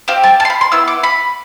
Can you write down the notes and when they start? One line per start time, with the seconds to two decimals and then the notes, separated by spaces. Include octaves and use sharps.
0.08 C4 G4 F5
0.23 A5
0.40 A5
0.45 C6
0.50 B5
0.61 C6
0.72 B3 E4 E6
0.88 D6
1.03 B5